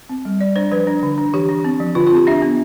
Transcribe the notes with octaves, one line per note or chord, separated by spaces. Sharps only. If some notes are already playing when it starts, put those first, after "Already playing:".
C4
G3
G3 D5
D4 C5
F3 B4
D4
D3
D4
E3 G4
D4
C4
F3
D3 F4
F4
C4
G4
D4 E5
B3